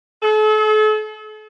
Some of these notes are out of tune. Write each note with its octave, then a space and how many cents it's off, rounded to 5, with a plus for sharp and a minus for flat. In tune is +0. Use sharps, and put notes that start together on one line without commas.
A4 -40